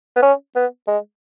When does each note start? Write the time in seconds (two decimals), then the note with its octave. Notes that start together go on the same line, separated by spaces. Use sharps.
0.16 B3
0.22 C#4
0.56 B3
0.87 G#3